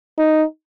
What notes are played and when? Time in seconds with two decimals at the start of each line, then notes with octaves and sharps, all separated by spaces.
0.18 D#4